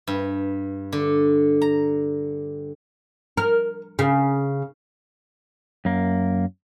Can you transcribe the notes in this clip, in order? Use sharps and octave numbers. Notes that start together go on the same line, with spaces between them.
G2
D3
A#5
A#4
C#3
F#2 A#3